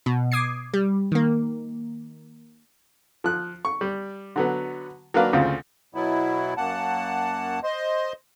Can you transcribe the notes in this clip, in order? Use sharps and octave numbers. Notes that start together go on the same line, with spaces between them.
B2
D6 D#6 G#6 C7
G3
D#3 A#3
F3 F#6
C#6
G3
D3 F#3 B3
F#3 A#3 D4 B4 F5
D2 C#3 C4 F4
B2 F#3 B3 E4
F#2 A#3 F#5 A5
C5 D#5 C6